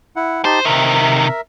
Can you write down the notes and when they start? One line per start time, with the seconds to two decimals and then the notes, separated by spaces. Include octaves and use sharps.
0.16 E4 F#5
0.45 D#4 G4 C5 A5
0.65 C3 D#3 A#4 E5